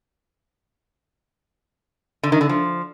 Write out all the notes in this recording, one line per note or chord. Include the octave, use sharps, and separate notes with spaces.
D3
D#3
D3
F3